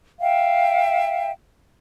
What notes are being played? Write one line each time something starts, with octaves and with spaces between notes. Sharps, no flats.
E5 F5 G5